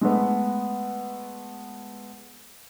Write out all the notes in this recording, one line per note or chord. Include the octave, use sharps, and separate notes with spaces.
G#3 A3 B3